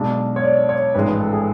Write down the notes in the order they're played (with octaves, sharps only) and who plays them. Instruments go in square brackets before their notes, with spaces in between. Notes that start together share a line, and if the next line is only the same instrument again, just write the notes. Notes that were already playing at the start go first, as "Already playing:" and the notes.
Already playing: [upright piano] B1 B2 G#3 D4
[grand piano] C#5
D5
C#5
[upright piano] A1 G#2 F3 G#3 [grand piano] B4
[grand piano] B4
A4
G#4